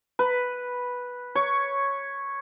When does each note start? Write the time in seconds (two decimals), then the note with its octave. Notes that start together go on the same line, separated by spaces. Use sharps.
0.19 B4
1.35 C#5